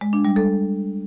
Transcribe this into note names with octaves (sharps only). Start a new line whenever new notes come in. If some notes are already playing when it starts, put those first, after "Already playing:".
G#3
D4
G3
A4